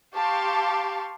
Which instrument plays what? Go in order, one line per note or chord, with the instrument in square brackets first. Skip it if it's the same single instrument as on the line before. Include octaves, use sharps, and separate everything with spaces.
[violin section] G4 F5 A5 C6 C#6